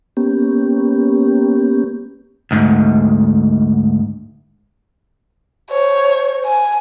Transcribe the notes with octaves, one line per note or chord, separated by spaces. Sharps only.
A#3 B3 C#4 G4
D2 G#2
C5 C#5
G#5